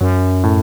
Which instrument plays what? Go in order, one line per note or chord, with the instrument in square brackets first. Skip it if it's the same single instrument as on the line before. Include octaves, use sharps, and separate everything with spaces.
[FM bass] F#2 [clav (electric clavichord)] F#3
[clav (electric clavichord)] A2